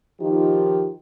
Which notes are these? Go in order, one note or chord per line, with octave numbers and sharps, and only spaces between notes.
D#3 F3 D#4 F4 G4